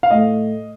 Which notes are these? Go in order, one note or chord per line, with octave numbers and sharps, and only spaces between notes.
F5
A2 A3 D#5